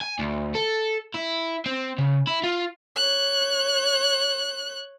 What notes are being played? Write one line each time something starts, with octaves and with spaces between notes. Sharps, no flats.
G#5
D2
A4
E4
C4
C#3
E4
F4
C#5 F#6